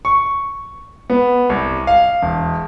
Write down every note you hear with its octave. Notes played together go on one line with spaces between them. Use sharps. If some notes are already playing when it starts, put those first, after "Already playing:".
C#6
B3
C2
F5
E1